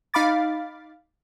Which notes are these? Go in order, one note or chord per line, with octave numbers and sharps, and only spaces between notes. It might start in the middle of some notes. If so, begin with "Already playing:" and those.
D#4 F5 B5 D6 A6